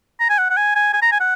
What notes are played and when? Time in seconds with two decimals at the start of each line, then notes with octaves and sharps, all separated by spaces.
0.20 A#5
0.30 G#5
0.38 F#5
0.50 F#5
0.57 G#5
0.76 G#5
0.93 G#5
1.02 A#5
1.12 G#5
1.20 F#5